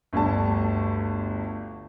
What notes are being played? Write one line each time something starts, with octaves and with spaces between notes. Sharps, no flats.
G1 D2 G3 A5